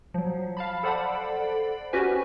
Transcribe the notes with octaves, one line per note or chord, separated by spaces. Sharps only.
F3 F#3
F5 A5 B5
A4 C5 D5 F#5 B5
C#4 F#4 G4 B4 G#5